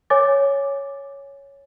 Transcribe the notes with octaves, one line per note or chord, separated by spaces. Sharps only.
C#5 G#5 D6 A6